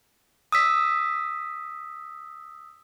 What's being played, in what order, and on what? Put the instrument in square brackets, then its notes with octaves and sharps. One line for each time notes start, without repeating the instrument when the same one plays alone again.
[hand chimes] D#6 E6 B6